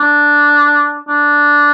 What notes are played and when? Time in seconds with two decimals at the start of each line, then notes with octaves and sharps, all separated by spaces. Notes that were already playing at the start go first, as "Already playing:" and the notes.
Already playing: D4
1.08 D4